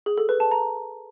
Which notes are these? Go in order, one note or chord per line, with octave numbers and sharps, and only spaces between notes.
G#4
A4
B4
A5
A#5